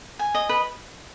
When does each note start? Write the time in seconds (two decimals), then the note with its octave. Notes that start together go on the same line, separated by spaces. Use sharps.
0.19 G#5
0.35 D#5
0.49 B4